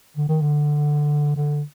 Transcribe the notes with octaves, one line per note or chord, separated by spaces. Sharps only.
D3
D#3
D3
D3